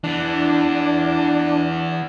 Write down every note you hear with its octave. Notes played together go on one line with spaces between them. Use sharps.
E3 B3 D4